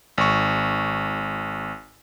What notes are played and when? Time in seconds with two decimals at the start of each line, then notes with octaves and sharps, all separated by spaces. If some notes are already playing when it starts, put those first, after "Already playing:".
0.18 G#1 C#6